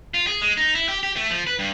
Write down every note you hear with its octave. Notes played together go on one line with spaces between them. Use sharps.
F4
G#4
G#3
D#4
E4
G4
G4
A3
F3
B4
G2